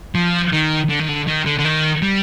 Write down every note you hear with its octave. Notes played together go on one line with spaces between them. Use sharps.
F3
D#3
D3
D#3
D3
D#3
D3
D3
D#3
G3